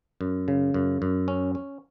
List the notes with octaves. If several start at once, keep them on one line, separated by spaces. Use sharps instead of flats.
F#2
C#3
F#2
F#2
C#4
C#4